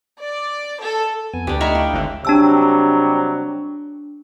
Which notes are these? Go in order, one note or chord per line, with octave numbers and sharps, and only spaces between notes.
D5
A4
F2 B3 G#5
D2 D4 G4
D#4 C#5 E5 A#5 B5 F6
D4 E4 F5 G5
G#1 D3
C3 F#3 G3 D4 A5 E6